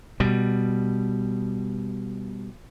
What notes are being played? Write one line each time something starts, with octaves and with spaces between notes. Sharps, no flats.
B2 G3